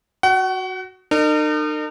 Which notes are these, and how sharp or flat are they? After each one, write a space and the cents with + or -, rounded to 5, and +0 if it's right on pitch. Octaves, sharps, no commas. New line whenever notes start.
F#4 +0 F#5 +35
D#4 -40 A#4 -40